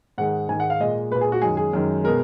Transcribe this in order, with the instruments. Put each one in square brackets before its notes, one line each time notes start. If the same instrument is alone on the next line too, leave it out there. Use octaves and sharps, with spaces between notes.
[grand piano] G#2 D#3 G#3 F#5
G#2 D#3 G#3 G#5
F#5
F5
A#2 G#3 D#5
A#2 G#3 B4
G#4
F#4
F#2 D#3 G#3 G#4
G#4
F#2 D#3 G#3
B2 G#3 A#4